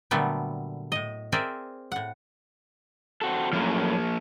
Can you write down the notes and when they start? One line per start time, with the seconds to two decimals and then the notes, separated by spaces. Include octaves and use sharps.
0.11 A#2 D3 F#3 G3 A3 B3
0.92 A2 D#5
1.32 C4 G#4 A#4 C5 D5 E5
1.92 A2 F#5
3.21 C4 F#4 A4
3.53 F#2 A2 F3 A#3